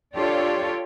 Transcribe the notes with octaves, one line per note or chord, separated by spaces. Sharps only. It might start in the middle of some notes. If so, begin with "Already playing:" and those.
D4 F4 G4 A4 C#5 D5